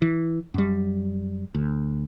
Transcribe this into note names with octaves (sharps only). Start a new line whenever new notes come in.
E3
F#2 G3
D2